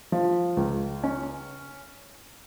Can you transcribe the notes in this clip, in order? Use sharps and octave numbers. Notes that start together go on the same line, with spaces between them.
F3
C#2
C#4